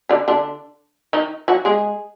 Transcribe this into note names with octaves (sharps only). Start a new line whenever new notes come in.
D3 D4
D3 D4
D#3 D#4
F#3 F#4
G#3 G#4